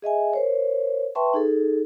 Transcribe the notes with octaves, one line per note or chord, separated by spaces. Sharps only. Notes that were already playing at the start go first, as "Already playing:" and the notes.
G#4 D#5 E5 G#5
A#4 C5 C#5
B4 E5 G5 A5 C6 C#6
D#4 G#4 A4